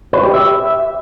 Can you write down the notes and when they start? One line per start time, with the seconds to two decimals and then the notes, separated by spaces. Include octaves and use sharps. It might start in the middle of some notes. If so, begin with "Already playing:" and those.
0.13 B4
0.23 G4
0.34 E5